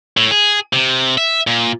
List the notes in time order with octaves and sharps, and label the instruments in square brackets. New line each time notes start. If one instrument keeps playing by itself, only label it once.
[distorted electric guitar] A2
G#4
C3
E5
A#2